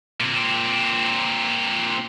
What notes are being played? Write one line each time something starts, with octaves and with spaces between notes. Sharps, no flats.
A#2 C4